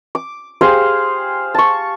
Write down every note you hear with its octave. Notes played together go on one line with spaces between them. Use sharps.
D6
G4 G#4 C5 F5
A5 C#6